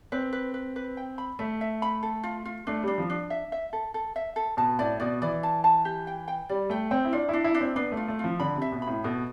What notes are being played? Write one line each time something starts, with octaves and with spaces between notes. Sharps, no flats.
C4 B4
B4
B4
B4
G5
B5
A3 E5
E5
B5
A4
F4
F4
A3 D4
G3 D4
F3
D4
E5
E5
A4
A4
E5
A4
B2 A5
A2 D5
B2 D5
E3 D5
A5
A5
G4
G5
G5
G3 D5
A3 G5
C4 G5
E4
D4 F4
D4 E4
E4
D4
C4
B3 D4
A3
F4
A3
F3 F4
D3 B5
C3
E5
B2
B5
A2
B2 A4